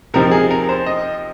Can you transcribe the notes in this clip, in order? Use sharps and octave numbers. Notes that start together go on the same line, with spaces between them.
C3 F3 C4 D#4 A#4
G#4
A#4
C5
D#5